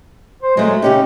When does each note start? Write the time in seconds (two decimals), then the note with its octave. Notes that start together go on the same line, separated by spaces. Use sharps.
0.42 C5
0.57 F#3 G#3 A3
0.82 C#3 C#4 D#4 G4